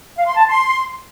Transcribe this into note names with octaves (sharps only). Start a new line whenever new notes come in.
F5
C6
A5
C6